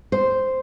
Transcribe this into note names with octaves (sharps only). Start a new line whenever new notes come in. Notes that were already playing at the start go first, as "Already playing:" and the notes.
C5